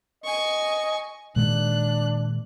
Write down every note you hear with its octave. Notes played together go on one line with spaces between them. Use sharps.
D#5 G#5 C#6
A#2 D#3 G#3 D4 F#6